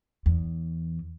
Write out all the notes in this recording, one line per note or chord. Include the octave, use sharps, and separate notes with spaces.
E2